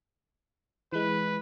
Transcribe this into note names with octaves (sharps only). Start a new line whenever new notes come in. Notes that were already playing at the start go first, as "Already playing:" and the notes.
E3 G#3 B4